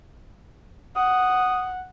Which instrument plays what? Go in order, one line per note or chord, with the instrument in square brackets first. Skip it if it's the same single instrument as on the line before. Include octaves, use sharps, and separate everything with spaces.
[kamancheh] F#5 [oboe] D#6